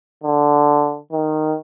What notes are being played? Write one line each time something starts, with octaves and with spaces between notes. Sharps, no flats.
D3
D#3